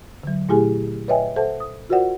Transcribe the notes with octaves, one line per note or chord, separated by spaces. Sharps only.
D3 F#3
A#2 A3 E4 G4 G#4 G#5
B4 C#5 D#5 E5 G5 G#5
A4 C5 E5 F#5 A5
D#6
F4 F#4 A#4 C5 D5 F#5